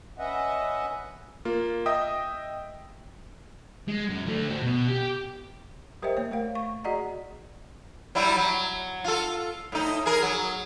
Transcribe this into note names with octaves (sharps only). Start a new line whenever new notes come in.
C#4 B4 D#5 E5 F#5
A#3 F4
D#5 E5 G5 D#6
G#3
F#2
D3 A3
C4 F#4
B2
G4
G4 A#4 C5 D#5 E5 G5
A#3 C#5
A3 A#4 F5
C#6
F#4 G#4 D5 D#5 F#5 A#5
F#3 G3 E4
F#3
F4 A4
A2 D#4
G#4 A#4
F#3